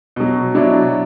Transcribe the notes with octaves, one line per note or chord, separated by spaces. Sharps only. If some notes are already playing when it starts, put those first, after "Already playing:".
B2 F#3
B2 F#3 D4 E4